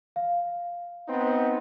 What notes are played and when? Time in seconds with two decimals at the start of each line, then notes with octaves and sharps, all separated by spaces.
0.16 F5
1.08 B3 C4 D#4